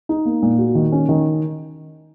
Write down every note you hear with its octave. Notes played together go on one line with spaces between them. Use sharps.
D#4
A#3
A#2
F#4
D#3
C#4
D#3